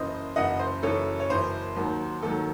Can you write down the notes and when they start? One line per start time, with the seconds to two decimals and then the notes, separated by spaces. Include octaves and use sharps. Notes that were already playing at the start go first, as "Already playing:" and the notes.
Already playing: F#1 F#2 E3 C5 D#5
0.36 F#1 F#2 E3 D#5 F#5
0.59 C5
0.83 F#1 F#2 E3 A4 C#5
1.20 C#5
1.30 F#1 F#2 E3 C5
1.76 D#2 D#3 F#3
2.22 D#2 D#3 F#3 A4